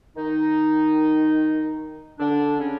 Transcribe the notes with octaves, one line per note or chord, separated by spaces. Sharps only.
D#3 D#4
D3 D4
C#3 C#4